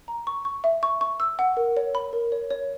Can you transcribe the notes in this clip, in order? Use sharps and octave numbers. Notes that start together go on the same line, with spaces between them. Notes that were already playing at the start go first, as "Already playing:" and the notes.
A#5
C#6
C#6
E5
C#6
C#6
E6
F#5
A#4
C#5
B5
A#4
C#5
C#5